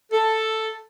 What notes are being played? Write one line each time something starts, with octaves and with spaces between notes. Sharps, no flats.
A4